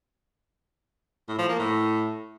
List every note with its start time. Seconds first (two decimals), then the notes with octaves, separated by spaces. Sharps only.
1.28 A2
1.39 F3
1.49 A#3
1.59 A2